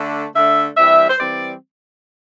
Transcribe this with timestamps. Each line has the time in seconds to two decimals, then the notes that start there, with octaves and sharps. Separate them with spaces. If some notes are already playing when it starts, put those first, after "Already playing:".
Already playing: D3 A3 D4
0.34 D3 A3 D4 E5
0.77 G2 E3 G3 C4 E5
1.10 C5
1.20 E3 G3 C4 D5